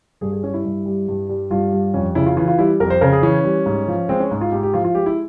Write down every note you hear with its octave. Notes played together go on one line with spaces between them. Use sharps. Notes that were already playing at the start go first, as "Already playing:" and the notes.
G2 G#4
G#4
G3 C#4
E4
G2
G3
G2
G3
G2 F4
G3
F2 C#4
C#3 E4
F4
E3 F4
F4
G3 E4
F2 A#4
C5
C#3 A#4
G#4
E3 C#4
G3
G#2
F3
G#3 C4
C#4
G#2
F4
G#2 G4
G4
F3 F4
F4
G#3 G4
E4